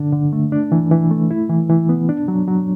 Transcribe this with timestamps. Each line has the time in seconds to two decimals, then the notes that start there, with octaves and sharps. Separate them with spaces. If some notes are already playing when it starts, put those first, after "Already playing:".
Already playing: D3 D4
0.12 D3
0.33 A3
0.52 D4
0.72 E3
0.91 E3
1.11 A3
1.31 E4
1.50 E3
1.70 E3
1.89 B3
2.09 D4
2.28 F#3
2.48 F#3